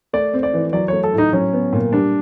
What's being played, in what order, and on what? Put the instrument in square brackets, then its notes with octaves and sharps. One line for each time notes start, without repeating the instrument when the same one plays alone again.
[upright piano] A3 [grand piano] D5
[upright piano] C4
[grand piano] D5
[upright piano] E3
[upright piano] F#3 [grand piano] D5
[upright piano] A3 [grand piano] C#5
[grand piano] A4
[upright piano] A2
[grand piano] D#4
[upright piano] F#3 [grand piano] C#4
[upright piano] B3
A#2
[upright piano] G3 [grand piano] D4